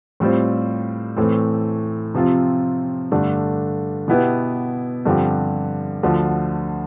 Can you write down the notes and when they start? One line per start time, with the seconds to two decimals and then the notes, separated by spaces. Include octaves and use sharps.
0.20 A2 G3 C4 F4 C5
1.17 A2 E3 A3 C4
2.14 C3 F3 C4 F4
3.12 G2 D3 A3 D4
4.08 B2 B3 E4 G4 B4
5.06 G2 D3 F3 C4 G4
6.03 D2 D3 F3